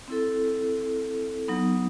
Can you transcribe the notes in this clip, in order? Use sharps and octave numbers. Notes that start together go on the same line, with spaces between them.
C4 E4 A4
F#3 B3 D#4